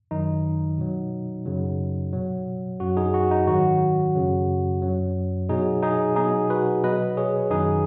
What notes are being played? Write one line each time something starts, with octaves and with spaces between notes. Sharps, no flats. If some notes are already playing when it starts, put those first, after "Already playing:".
F#2 D#3 F#3 D#4
B2 F#3
F#2 C#3 F#3
B2 F#3
F#2 F#3 F#4
D#4 G#4
F#4
D#4
G#2 D#3 F#3 F#4
F#2 C#3 F#3
F#2 F#3
B2 F#3 D#4 G#4
D#4 G#4
B2 F#3 D#4 G#4
F#4 B4
B2 F#3 B4 D#5
G#4 C#5
F#2 D#3 F#3 D#4 G#4